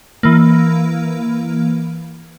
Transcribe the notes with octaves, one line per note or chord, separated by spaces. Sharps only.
E3 A#3